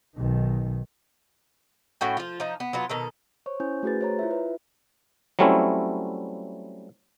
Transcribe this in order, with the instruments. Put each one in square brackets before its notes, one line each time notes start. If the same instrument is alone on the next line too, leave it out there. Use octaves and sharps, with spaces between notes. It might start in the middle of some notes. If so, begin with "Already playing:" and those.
[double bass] B1 D#3
[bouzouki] A2 C#4 F#4 G5
F3 F4
F3 D#4
B3
F#3 B3 F4
B2 D#3 A4
[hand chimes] C5 C#5 C#6
C#4 E4 C5 G#5 G6
A3 F#4 G#4 B4 A6
C5 C#5 A#5
E4 F4 E5
B4
[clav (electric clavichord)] F#3 G3 A3 C4 C#4 E4